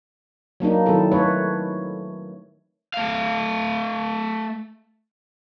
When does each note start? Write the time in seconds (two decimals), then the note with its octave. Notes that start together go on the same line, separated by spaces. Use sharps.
0.60 F#3 A#3 D4 D#4
0.86 D#3 F#3 C4 E4 A4
1.12 A3 D#4 B4 C#5
2.94 A3 F5